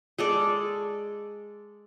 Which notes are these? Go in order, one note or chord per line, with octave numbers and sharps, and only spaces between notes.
G#3 A4 D5